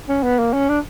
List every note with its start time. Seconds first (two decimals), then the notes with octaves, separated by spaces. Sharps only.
0.09 C#4
0.23 B3
0.39 A#3
0.53 C#4
0.69 D4